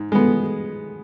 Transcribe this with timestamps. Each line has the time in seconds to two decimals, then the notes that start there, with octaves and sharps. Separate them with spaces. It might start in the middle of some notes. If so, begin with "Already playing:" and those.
Already playing: G#2
0.12 G#3 B3